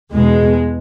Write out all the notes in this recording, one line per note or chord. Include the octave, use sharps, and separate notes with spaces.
E2 B2 G#3